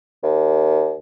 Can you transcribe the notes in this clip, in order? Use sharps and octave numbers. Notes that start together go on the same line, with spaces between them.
D#2